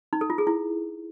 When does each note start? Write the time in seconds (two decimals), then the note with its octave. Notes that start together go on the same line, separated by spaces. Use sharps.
0.13 D#4
0.21 A4
0.30 F4
0.38 G#4
0.47 E4